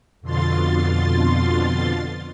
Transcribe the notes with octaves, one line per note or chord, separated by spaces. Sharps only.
F2 B2 D3 F4 C6 A6